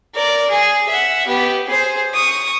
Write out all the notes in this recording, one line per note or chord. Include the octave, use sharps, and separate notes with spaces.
A#4 D5
G#4
E5 F#5
B3 G4
G#4 C5
C#6 D#6